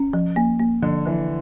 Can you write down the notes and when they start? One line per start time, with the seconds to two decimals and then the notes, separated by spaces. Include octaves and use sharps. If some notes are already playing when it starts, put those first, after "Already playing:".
Already playing: C#4
0.13 F3
0.36 A#3
0.60 A#3
0.82 D3 F3
1.06 E3 F3